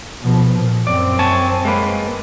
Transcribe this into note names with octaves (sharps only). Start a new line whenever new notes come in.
B2 F3
A#2
F#2 C4 D5
C#5 G#5 A5
G#3 A#3 B4